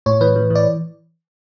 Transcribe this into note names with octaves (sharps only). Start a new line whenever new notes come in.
A2 C#5
E3 B4
E3
E3
D5